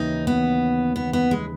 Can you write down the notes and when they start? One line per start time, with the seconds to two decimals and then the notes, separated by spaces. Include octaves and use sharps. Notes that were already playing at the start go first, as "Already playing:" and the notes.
Already playing: D#2 C#3 E3 D#4
0.27 B3
0.96 B3
1.13 B3
1.31 G#3